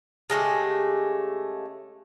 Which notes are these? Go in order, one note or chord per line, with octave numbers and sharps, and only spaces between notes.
C#3 G#3 A3 G4